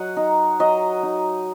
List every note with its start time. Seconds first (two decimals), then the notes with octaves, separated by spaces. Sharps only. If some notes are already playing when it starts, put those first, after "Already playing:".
Already playing: F#3 D#5 F#5
0.16 D#4
0.60 F#3 D#5
1.03 D#4